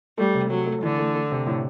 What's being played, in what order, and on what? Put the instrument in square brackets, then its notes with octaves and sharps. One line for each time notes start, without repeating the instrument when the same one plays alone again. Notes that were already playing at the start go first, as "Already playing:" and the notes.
[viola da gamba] G3 [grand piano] A3
[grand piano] C3
[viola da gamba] F#3 [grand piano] A3
[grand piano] A3
[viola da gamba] D3 [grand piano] E3
[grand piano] A3
A3
C3
A2